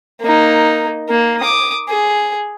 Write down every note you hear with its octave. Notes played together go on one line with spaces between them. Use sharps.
A#3 D#4
A#3
D6 D#6
G#4